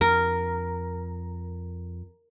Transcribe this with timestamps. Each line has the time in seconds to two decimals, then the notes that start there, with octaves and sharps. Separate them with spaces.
0.01 F2 A#4